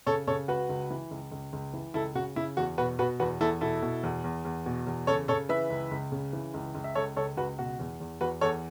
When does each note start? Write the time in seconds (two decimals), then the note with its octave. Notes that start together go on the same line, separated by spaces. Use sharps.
0.06 C#3 A4 C#5
0.27 C#3 A4 C#5
0.48 C#2 F#4 B4
0.69 C#2
0.90 E3
1.11 C#2
1.32 C#2
1.53 C#2
1.73 E3
1.94 C#2 E4 A4
2.15 C#3 F#4
2.36 C#3 E4
2.57 E2 F#4
2.78 B2 F#4 B4
2.99 B2 F#4 B4
3.20 E2 F#4 B4
3.41 E2 E4 A4
3.61 B2 E4 A4
3.82 B2
4.03 E2
4.24 E2
4.45 E2
4.66 B2
4.87 E2
5.07 C#3 A4 C#5
5.28 C#3 A4 C#5
5.49 E3 B4 E5
5.70 C#2
5.91 C#2
6.12 C#3
6.33 E3
6.54 C#2
6.75 C#2
6.84 E5
6.95 C#2 A4 C#5
7.16 C#2 A4 C#5
7.37 C#2 F#4 B4
7.58 B2 F#4
7.79 E2
8.00 E2
8.21 E2 F#4 B4
8.41 E2 A4 C#5